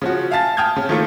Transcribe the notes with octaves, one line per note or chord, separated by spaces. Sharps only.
C#3 F3 F#4
E5 F5 G#5 A5 A6
G5 A5 D#6 F6 G6 G#6
C#3
D#3 F3 A3 A#3 F4 A4